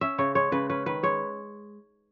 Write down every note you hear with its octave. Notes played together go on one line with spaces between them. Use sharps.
C#4 E5
C#3 C#5
G#3 C#5
C#3 B4
C#4 B4
D#3 B4
G#3 C#5